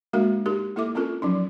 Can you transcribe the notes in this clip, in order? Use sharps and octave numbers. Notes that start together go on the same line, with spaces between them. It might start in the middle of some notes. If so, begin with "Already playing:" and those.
G#3 A#3 D4 F#4 A#4 F5
D#4 G4 A#4
A#3 E4 A4 E5 D6
C4 C#4 F4 A4 A#4
F3 F#3 C#4 D#4